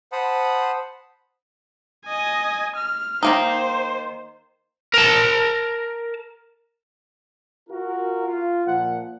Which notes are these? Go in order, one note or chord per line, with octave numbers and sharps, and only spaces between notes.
C5 F#5 A5 B5 D#6
D#5 G#5
F6
D#3 A#3 D#4 C5
A#4 A5
F4 F#4 A#4
F4
A#2 F3 F#5